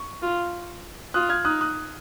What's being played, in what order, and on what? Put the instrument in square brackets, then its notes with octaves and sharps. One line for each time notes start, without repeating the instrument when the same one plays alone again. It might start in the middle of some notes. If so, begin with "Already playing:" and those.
Already playing: [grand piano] C#6
[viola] F4
[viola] F4 [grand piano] D#6 F#6
[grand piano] F6 G#6
[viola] D#4 [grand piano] D#6 F#6
[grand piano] D#6 F#6